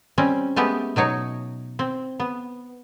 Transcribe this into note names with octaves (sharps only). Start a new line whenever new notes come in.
G3 C4 C#4
G#3 A3 B3 G4
B2 F#3 D#4 C#5
C4
B3